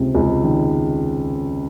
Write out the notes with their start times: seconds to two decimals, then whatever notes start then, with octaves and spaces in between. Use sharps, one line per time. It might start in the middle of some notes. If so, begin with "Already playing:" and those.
Already playing: C#2 C3
0.15 C#2
0.44 D#3